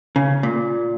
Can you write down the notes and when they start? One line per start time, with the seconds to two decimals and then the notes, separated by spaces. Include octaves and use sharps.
0.16 C#3
0.43 A#2